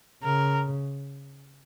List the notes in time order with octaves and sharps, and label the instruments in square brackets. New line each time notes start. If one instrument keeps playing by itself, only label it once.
[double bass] C#3 [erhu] A#4